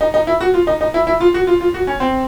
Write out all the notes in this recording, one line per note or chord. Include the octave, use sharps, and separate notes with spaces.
D#4
D#4
E4
F#4
F4
D#4
D#4
E4
E4
F4
F#4
F4
F4
F#4
C#4
C4